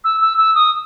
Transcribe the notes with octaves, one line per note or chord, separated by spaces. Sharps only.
E6
E6
E6
D#6